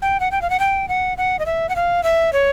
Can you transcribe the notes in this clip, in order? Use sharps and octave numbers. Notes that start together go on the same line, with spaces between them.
G5
F#5
G5
F5
F#5
G5
F#5
F#5
D#5
E5
F#5
F5
E5
C#5